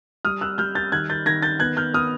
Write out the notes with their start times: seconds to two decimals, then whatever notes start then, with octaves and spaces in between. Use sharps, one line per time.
0.25 G3 D#6 F6
0.41 E6 F#6
0.58 G3 F6 G6
0.75 G6 A6
0.92 D#3 F#6 G#6
1.10 G6 A6
1.26 D#3 G#6 A#6
1.42 G6 A6
1.60 B3 F#6 G#6
1.77 F6 G6
1.93 B3 D#6 F6